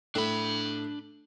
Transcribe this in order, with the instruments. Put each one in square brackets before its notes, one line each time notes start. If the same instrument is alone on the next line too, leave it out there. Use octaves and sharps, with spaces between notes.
[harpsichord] A2 [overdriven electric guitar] D4 B5